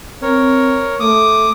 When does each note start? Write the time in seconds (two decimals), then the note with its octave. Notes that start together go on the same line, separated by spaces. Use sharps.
0.22 C4 A#4 C#5
1.00 A3 D6 D#6